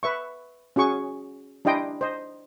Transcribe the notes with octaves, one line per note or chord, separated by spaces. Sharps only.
B4 E5 C#6
C#4 F#4 G#4 C#6
D4 E4 G4 D#5 G5 C6
C5 D#5